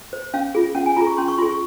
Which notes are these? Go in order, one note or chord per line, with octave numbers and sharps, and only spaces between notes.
C5
C#4 F5
F4 G#4
C#4 F#5
G#5
F4 G#4 A#5
C#6
C#4 C6
C#6
F4 G#4 C6
C#6